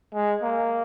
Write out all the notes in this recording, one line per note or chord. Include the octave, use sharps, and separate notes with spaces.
G#3
A#3